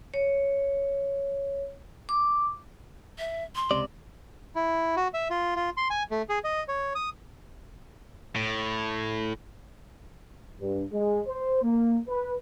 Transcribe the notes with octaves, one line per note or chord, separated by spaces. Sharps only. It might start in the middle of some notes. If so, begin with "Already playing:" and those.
C#5
D6
E5
C6
C#2 C3 D5
E4
F#4
E5
F4
F4
C6
G#5
A3
G#4
D#5
C#5
D#6
A2
G2
G#3
C5
A#3
B4